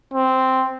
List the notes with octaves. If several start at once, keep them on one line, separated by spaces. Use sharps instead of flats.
C4